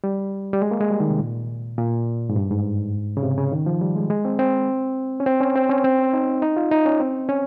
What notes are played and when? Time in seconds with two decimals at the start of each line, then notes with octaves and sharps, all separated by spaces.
0.04 G3
0.53 G3
0.62 G#3
0.71 A#3
0.81 G#3
0.90 G3
1.00 D#3
1.09 C3
1.20 A#2
1.78 A#2
2.29 G#2
2.36 G2
2.50 G#2
3.17 C#3
3.23 C3
3.38 C#3
3.52 D#3
3.66 F3
3.81 G3
3.96 G#3
4.10 G#3
4.25 C4
4.39 C4
5.20 C#4
5.26 C4
5.40 C#4
5.56 C4
5.69 C#4
5.84 C4
5.99 C#4
6.13 D#4
6.42 D#4
6.57 F4
6.72 D#4
6.86 C#4
7.00 C4
7.29 C#4